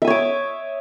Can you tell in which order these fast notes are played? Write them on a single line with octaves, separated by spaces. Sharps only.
E5 D#6 C#5 D6